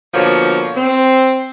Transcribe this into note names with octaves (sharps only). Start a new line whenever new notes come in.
B2 D3 F3 A#3 C#5
C4